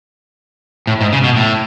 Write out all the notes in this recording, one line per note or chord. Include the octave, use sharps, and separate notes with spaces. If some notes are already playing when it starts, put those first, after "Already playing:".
A2
G#2
C#3
B2
A2